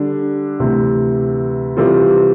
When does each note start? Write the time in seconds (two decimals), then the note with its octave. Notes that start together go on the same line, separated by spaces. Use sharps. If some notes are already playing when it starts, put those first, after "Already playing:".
Already playing: D3 G3 D4
0.59 D2 C3 E3
1.77 C3 E3 G3 C4 F4